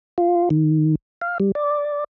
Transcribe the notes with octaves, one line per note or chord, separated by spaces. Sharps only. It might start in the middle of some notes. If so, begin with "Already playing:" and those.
F4
D#3
F5
G3
D5